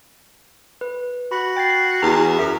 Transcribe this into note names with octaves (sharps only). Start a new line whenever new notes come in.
B4
F#4 B5
G5 A6 C7
E2 F#4 A#5
F#2 E5